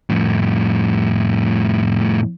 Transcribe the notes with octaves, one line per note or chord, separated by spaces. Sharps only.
F2 A2